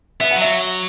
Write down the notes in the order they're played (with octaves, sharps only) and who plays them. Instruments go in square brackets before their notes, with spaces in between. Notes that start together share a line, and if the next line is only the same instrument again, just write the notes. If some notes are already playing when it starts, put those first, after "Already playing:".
[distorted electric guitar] B3 [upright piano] E5
[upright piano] F#5
[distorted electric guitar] F#3
[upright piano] E5